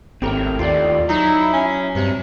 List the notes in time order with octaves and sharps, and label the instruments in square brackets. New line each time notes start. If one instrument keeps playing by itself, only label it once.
[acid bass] G#1 [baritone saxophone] A2 [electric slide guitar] C4 G4 A#4
[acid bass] D#2 [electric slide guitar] F4 G4 D5
[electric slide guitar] F#3 [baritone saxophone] D#4 [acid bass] E4
[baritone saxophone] C#4
[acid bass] G2 [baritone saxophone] C3